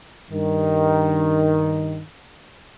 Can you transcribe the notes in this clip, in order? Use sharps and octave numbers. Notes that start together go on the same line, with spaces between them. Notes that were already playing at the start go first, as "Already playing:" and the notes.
G2 D#3